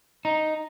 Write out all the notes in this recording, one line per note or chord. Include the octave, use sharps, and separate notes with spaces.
D#4